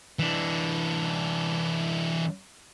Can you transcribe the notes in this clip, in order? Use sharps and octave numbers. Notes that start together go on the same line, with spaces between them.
E3 D4